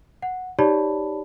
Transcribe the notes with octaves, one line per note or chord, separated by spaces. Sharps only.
F#5
D#4 G4 C#5 D5 A5 B5